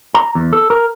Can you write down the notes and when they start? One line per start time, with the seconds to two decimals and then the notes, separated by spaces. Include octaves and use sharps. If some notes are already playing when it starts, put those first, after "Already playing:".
0.14 A#5
0.35 E2
0.53 A4
0.70 A#4